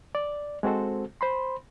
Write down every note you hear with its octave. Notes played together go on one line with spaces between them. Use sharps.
D5
G#3 C4 F#4 A4 C5
C5 B5 C6